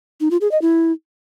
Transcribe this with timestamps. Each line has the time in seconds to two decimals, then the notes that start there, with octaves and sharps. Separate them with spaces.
0.20 D#4
0.31 F4
0.41 G#4
0.51 D#5
0.62 E4